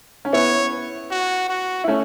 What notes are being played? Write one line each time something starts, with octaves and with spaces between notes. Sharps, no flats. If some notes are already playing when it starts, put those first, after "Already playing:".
C#4
B3 E4 C#5
F#4
F#4
E4
A3 C#4